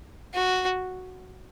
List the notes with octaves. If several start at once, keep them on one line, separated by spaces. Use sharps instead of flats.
F#4